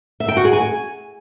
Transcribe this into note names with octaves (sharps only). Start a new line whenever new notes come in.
E5
G5
F#4
G#4
G#5